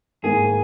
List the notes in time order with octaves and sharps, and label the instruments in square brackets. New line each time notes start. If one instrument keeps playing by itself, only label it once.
[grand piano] G#1 G#2 D#3 A#3 [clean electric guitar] G#4